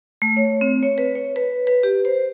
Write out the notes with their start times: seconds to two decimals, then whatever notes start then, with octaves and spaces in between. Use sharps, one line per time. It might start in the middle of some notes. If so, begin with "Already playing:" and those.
0.22 A3
0.37 C#5
0.61 C4
0.83 C#5
0.98 B4
1.15 C#5
1.36 B4
1.67 B4
1.83 G4
2.05 C5